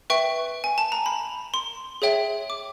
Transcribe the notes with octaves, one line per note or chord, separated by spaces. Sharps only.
B4 E5 G5 C#6
G#5
A5
A#5
B5
C6
G#4 C#5 E5 G5
D6